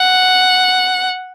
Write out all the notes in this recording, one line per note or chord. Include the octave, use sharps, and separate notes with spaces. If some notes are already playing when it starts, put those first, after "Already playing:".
Already playing: F#5